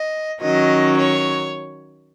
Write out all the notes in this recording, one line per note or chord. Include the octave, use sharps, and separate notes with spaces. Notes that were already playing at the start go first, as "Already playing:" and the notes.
Already playing: D#5
D#3 F#3 C#4 D#5
C#5